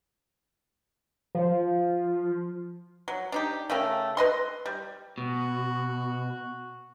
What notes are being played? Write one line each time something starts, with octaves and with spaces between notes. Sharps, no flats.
F3
F#3
D4 D#4 G4
C#3 A3 A#4 G5
B4 D#5 C6
G3
B2 F#4